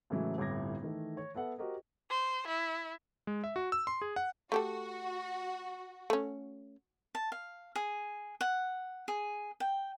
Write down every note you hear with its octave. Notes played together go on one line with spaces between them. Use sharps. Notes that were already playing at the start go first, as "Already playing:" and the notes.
A2 C#3 E3 F#3 G#3 A3
G1 C2 A2 D6 G#6 A#6
D#3 E3 A3
C#5
B3 A4 E5 F#5
F#4 G4 A#4 C5 D#5
C5
E4
G#3
E5
F#4
E6
C6
G#4
F#5
A3 F#4 G4 A4
A3 C#4
A5
F5
G#4
F#5
G#4
G5